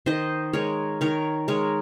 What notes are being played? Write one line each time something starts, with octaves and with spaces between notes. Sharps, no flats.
D#3 C5 D#5
G#3 A#4 C#5
D#3 A#4 C#5
G#3 A#4 C#5